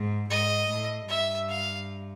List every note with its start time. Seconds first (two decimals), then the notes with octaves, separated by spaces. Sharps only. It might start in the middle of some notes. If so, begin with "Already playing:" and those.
Already playing: G#2
0.29 G#2 D#5
0.69 A2
1.08 G2 E5
1.49 F5